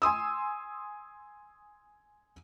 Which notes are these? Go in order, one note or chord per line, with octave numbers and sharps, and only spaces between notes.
G#5 C6 D#6 E6